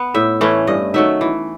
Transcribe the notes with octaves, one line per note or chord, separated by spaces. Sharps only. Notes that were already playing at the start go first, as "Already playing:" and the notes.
Already playing: B3
A2 E5
E3 A3 C#4
G2 D#5
D#3 F#3 A3 E5
E3